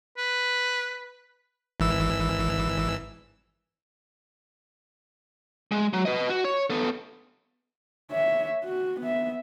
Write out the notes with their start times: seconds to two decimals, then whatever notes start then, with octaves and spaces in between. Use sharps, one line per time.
0.18 B4
1.80 G#1 E3 E6
5.72 G#3
5.93 F#3
6.05 B4 D#5
6.30 F#4
6.45 C#5
6.70 B3 A4
8.11 C#5 E5
8.64 F#4
9.01 B3 E5